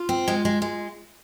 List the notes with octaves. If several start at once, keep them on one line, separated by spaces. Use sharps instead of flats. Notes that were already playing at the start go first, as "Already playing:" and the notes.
Already playing: F4
C4
G#3
G#3
G#3